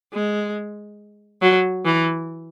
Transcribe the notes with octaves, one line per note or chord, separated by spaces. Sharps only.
G#3
F#3
E3